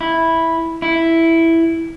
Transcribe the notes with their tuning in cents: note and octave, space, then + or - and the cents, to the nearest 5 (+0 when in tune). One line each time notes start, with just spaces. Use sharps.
E4 -5
E4 +0